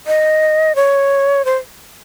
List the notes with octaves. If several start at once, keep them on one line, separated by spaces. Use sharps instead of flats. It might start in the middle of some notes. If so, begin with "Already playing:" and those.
D#5
C#5
C5